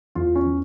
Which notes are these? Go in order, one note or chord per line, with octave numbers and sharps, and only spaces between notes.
E2 F4
C#4
E3